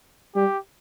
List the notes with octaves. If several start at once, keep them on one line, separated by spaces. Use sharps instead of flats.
G3 G4